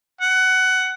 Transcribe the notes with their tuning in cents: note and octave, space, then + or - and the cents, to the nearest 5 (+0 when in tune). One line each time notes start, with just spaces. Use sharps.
F#5 +15